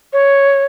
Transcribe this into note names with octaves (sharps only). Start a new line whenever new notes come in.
C#5